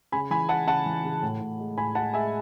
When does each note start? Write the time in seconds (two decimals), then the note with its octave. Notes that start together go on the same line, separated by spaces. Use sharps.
0.12 C#3 G#5 B5
0.31 E3 G#5 B5
0.49 G#3 F#5 A5
0.67 C#3 F#5 A5
0.86 E3
1.04 C#3
1.22 A2
1.41 A2
1.59 G#3
1.77 A2 G#5 B5
1.95 G#3 F#5 A5
2.14 G#3 E5 G#5